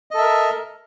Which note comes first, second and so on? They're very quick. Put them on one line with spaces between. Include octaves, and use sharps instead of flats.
D#5 A4 E5 A#4